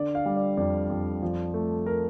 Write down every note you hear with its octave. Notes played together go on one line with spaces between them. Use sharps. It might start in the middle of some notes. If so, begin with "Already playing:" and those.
Already playing: D3 D5
F5
G3
D5
F2 D5
F2
F3
A3
A#4